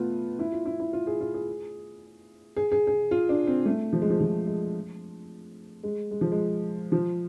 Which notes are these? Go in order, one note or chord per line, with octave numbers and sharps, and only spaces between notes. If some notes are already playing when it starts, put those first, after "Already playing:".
Already playing: A3 B3 F4
E4
F4
E4
E4
F4
G#4
F4
G#4
G#4
G#4
G#4
F4
D4
C4
A3
F3
G#3
F3
F3
G#3
G#3
G#3
F3
G#3
F3